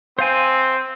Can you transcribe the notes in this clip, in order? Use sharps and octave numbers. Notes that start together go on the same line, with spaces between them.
C4 C5 F5 G#5